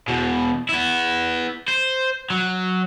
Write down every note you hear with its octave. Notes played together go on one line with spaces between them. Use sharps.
E2 B2
B3 E4
C5
F#3